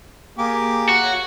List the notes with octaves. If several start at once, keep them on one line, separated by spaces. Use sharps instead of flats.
A#3 G4 G#4 D6
F#4
C#5